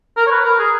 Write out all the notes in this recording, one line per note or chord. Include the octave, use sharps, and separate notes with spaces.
A#4
C#5
B4
A#4
G#4